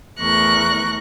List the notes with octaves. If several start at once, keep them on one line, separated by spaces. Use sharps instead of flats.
E2 A3 A#4 C#6 F#6 A#6